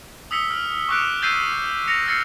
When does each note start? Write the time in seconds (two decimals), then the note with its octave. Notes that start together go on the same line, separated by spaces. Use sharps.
0.31 D#6 E6 B6 C#7 G7
0.50 F6
0.89 C#6 D6 F6 F#6 C#7 D7
1.22 E6 G6 A6 B6 C7 D#7
1.88 A#6 C#7 F7
2.06 E6 F6 A6 C7 C#7